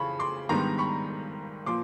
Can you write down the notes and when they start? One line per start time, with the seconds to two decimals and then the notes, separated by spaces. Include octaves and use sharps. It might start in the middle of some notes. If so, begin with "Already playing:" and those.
Already playing: F2 C#3 E3 B5 C#6
0.19 C6 D6
0.49 G#2 D#3 G3 B3 D4 A#5 C6
0.78 B5 C#6
1.66 A#2 F3 C6 D6